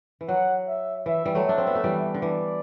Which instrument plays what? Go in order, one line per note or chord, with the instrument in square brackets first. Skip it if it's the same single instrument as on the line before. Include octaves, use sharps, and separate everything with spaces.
[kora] E3
[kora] F#3 [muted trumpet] F#5
[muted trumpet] E5
[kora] E3 [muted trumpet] E5
[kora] E3 G3
F#3 A3
[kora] D4 [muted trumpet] E5
[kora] C4
B3
A3
E3 G3
D3
[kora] E3 [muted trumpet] D5